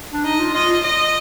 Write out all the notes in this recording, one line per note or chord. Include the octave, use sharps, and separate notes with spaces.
D4
D#4 D#5
F4
F4 D#5
D#5